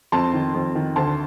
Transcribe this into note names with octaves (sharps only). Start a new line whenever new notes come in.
F2 A5 C6
D#3
F2
D#3
D2 A5 C6